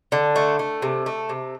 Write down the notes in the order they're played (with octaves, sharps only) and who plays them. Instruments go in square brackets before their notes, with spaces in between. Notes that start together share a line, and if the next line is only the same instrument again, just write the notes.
[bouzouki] D3
A3
A3
C3
A3
C3